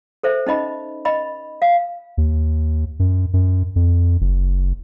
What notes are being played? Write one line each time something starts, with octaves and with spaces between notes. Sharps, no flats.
A4 C5 E5
C#4 D#4 D#5 B5
D#5 B5
F5
D#2
F#2
F#2
F2
F#1